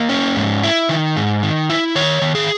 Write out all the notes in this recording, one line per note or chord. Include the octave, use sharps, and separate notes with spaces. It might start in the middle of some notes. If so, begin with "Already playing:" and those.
Already playing: A#3 D#5
C#4
G#2
E4
D#3
G#2
D#3
E4
D#3 C#5
D#3
G#4